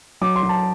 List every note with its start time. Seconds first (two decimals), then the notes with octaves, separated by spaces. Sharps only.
0.21 F#3 D6
0.36 C6
0.43 F#3
0.49 A5